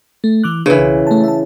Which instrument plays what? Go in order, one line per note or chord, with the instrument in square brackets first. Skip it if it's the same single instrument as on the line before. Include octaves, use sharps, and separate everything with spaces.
[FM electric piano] A3
E3 D6 F#6
[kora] C#3 E3 [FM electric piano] D4 A#4 B4
[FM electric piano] B1
A3 A5
E5 A5